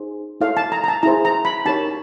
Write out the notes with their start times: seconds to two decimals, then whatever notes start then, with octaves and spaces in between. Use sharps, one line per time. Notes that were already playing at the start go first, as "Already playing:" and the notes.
Already playing: D#4 G#4 C5
0.41 E4 A4 C#5 F5
0.57 A5
0.72 A#5
0.84 A#5
0.88 A5
1.03 E4 G#4 C5 A#5
1.25 A#5
1.45 B5
1.65 D#4 G4 A#4 C#5 A5